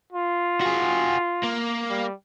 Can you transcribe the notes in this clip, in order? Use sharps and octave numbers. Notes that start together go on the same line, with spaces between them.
F4
F#4 G#4
A#3
G3